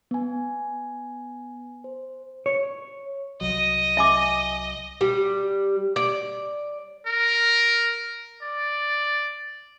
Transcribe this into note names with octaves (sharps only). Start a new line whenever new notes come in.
B3 G#5
C5
C#5
C2 F#3 D#5
E5 G#5 D6
G3
D5
A#4
D5